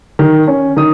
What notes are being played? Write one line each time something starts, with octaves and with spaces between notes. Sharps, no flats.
D#3
C#4
D#3 D#6